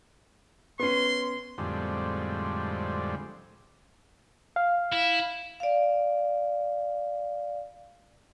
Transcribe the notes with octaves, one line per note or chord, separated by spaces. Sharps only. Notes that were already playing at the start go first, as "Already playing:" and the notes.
B3 C#4 C6
F2 A2 D3 G3 G#3 C4
F5
E4
D5 F5